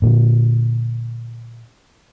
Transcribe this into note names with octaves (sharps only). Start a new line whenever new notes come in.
A#2 D3